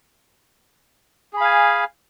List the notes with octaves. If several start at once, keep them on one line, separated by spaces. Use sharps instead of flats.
G#4 F5 G#5 B5